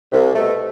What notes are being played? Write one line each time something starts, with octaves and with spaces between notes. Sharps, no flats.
C2
B2 A3